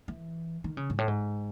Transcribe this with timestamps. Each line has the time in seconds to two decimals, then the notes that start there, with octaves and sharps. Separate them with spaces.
0.08 E3
0.64 D#3
0.77 C#3
0.90 G#2
0.98 A2
1.08 G#2